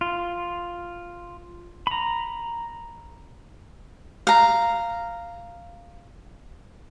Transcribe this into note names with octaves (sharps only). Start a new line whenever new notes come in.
F4
A#5 B5
F5 A#5